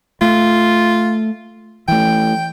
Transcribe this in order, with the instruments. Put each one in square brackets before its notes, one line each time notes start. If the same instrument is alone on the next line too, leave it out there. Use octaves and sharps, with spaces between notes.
[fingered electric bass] A3 [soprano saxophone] F4
[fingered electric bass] E3 A3 [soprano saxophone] G5